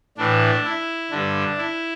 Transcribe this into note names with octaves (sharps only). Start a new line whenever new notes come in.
A2 E3 D4
E4
G2 D3 D4
E4